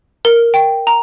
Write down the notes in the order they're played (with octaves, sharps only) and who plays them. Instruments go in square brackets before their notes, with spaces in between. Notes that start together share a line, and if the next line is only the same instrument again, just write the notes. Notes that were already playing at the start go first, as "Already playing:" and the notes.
[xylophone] A#4
G5
A#5